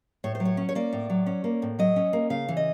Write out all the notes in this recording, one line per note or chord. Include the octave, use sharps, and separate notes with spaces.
A2 C#5
C5
F#3
C#5
C#4
C#5
A#3 D5
A2
F#3
C#4
A#3
A2
F#3 D#5
C#4
A#3
C#3 F5
E3
D#5